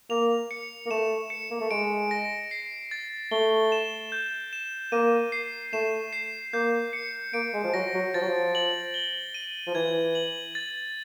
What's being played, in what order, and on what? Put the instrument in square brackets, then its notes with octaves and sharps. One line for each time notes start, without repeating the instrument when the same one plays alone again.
[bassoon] A#3 [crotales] F7
[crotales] C#7
[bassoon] A#3
[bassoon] A3 [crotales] E7
[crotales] C#7
[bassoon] A#3
A3
[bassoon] G#3 [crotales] D7
[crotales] A#6
C7
A6
[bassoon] A3 [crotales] G7
[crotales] E7
G6
E7
[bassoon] A#3 [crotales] D#7
[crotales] C7
[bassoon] A3 [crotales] E7
[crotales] C7
[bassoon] A#3 [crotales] G6
[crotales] C#7
[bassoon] A#3 [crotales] D7
[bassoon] G#3
F3
[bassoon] F#3 [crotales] A#6
[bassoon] F#3
[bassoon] F3 [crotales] A6
[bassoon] F#3
F3
[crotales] F#7
G7
D#7
[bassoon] F3
[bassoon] E3 [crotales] G#6
[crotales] F#7
A6